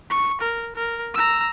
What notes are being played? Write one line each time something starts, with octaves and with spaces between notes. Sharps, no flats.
C#6
A#4
A#4
A#5 E6